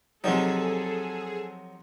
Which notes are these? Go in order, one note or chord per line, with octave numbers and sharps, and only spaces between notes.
C3 F3 F#3 D#4 G#4 A4 E6